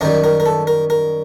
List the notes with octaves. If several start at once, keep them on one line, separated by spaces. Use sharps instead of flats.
F#2 D#3 G3 A#4
A#4
A#4
A4
A#4
A#4